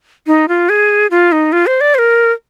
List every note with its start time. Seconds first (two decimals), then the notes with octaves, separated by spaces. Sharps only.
0.27 D#4
0.48 F4
0.69 G#4
1.11 F4
1.32 D#4
1.52 F4
1.66 C5
1.81 D5
1.95 C5
1.99 A#4